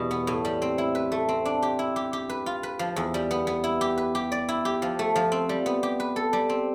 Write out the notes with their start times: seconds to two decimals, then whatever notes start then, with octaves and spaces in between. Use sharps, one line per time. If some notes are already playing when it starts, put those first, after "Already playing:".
Already playing: E2 B2 G3
0.11 B3
0.27 A2
0.45 G3
0.62 C4
0.78 E4
0.95 B4
1.12 A3
1.29 C4
1.45 D4
1.62 G4
1.79 E4
1.96 G4
2.13 G4
2.29 B4
2.46 F4
2.63 B4
2.79 F3
2.96 E2
3.14 G3
3.31 B3
3.47 B3
3.64 E4
3.81 G4
3.98 B4
4.15 G4
4.32 D5
4.49 E4
4.65 G4
4.82 F3
4.99 A3
5.16 F3
5.32 C4
5.49 G3
5.66 B3
5.83 G4
6.00 B4
6.16 A4
6.33 G3
6.49 C4